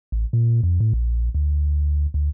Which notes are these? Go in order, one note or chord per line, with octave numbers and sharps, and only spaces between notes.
A1
A#2
F2
A2
A#1
D2
D2